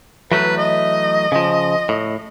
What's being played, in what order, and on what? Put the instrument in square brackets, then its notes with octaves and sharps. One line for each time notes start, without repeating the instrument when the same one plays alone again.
[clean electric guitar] E3 F#3 A3 [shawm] B4
[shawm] D#5
[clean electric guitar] C#3 F3
A2